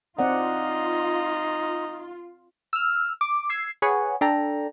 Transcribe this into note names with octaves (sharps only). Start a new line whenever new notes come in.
C4 D#4 F4 D5 F#5
E6 F6
D6
E6 G#6 C7
G#4 B4 C#5 F#5
D4 A4 G5 A#5